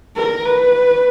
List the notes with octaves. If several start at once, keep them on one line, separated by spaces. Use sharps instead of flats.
A#4
B4